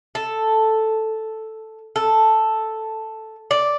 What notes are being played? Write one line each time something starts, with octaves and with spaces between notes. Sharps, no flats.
A4
A4
D5